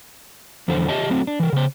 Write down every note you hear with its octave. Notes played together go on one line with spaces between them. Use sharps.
E2 D3 F3 A4 C5
G4 C#5 D#5 E5 A5
F#3 A3 C4
D4
E3 A#4
C#3 C5